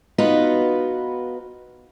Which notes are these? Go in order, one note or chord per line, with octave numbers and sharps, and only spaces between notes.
B3 D#4 F4 F#4 B4